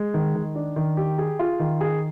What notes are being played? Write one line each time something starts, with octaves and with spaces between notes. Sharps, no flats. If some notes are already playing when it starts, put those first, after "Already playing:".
Already playing: G#3
D#3
D#3
D4
D#3
G4
G#4
F4
D#3
G#4